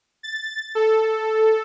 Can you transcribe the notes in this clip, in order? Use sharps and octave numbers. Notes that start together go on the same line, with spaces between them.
A6
A4